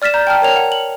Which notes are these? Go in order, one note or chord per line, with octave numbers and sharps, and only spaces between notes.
D5 F6 A6 B6 E7
D5 A#5 G6
G5 A5 F6
A#4 C#5 F7
F#5
F#7